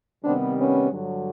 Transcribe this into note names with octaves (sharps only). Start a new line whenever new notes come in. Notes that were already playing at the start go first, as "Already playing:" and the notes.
C3 D#3 G3 B3 C4 D4
B3 C#4
G2 D3 F#3